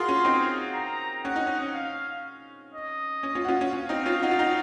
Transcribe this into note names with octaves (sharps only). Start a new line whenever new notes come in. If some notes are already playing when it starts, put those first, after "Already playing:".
Already playing: F4 F#4 G#4 A#4 C6
C#4
C4 D#4
A#5
C#4 F#5
D#4
C#4
F5
D#5
C#4
C#4 F4
F#4
C#4 F4
C#4
C#4 F5
C4 D#4
C#4 F4
D#4 F#4
F4
D#4 F#4